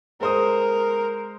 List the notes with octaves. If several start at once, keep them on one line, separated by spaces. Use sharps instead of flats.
G#3 A#4 C5 D#6